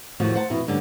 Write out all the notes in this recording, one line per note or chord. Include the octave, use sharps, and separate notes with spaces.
E2 A2 D#3 F3 F#4
C5 F#5 A5
F2 B2 E4
D2 G2 D3 C#4 A4